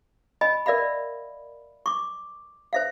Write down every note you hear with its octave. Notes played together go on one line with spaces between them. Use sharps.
D#5 G#5 B5
A#4 D5 E5 F5 B5
C#6 D6
C5 E5 F5